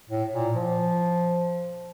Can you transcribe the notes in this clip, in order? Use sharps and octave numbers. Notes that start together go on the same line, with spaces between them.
A2
A#2
F3